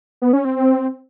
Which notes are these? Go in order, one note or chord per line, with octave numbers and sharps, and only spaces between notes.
B3
C#4
C4
C4